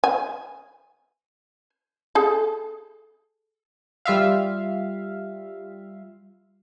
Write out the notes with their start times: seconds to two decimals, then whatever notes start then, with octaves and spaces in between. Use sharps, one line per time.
0.04 G#5
2.15 G#4 A4
4.05 G3 F4 E5 F5